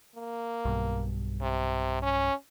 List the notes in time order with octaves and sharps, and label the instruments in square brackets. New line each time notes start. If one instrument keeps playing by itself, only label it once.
[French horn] A#3
[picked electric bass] B1 G2
[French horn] C3
C#4